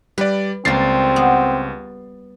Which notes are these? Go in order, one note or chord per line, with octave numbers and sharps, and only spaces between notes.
G3 B4 D5
C#2 G3 A#3 C4 A6 C7
B3